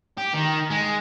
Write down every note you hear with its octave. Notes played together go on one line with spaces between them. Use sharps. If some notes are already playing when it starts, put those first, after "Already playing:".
G4
D#3
G#3